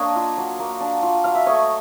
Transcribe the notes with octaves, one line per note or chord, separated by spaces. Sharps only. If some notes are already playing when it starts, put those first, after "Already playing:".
Already playing: A#3 D4 C#5 D#5
F4
F#3
A#3
D4
F4
F#3 F5
E5
A3 C#5 D#5